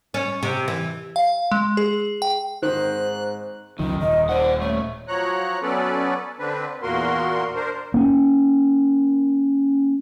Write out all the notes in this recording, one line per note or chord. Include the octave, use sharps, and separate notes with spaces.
C#4
C3
E3
F5
G#3
G#4
G5
G#2 D#3 C5 F#6
C#2 F#2 D#3 F3 D#4
D#1 D#5
C5 D5 F#5
A3 C#5
F3 F#3 C#5 A#5 F#6
F#3 B3 C#4 A4 B4 D5
D3 C4 D4 B4
E2 A#2 A#3 F#4 A#4 C6
D4 A#4 C5
A#3 C#4